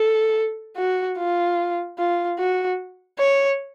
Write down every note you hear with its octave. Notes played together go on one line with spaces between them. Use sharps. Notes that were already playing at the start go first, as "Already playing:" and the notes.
Already playing: A4
F#4
F4
F4
F#4
C#5